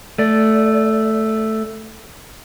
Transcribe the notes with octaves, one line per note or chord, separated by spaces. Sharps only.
A3 D5